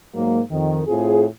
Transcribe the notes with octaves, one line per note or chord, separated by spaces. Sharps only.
G#2 F#3 A#3
F2 D#3
A2 C4 F4 G#4